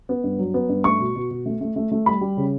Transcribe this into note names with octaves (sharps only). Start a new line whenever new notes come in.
B3
G2
F#3
B3
G2
A3 C#6
B2
B2
B2
A3
A3
A3
A3
G3 B5
G3
C#3